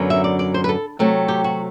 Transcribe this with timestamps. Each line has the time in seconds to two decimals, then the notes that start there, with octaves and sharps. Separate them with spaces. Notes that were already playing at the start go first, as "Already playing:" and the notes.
Already playing: F#2 D3 F#3 B3
0.10 E5
0.24 D5
0.39 D5
0.54 C5
0.64 B4
0.69 A4
0.99 C3 F#3 A3 C4
1.28 G4
1.44 F#4